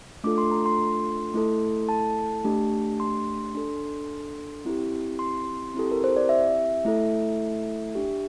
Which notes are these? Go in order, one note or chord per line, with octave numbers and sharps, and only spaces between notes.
A3 D4 F4 A4 D6
C6
A#5
C6
A3 E4 A4
A5
A3 D4 G4
C6
D4 A4
C4 E4 G4
C6
C4 E4 G4 A4
A#4
C5
D5
E5
A3 E4 A4
D4 G4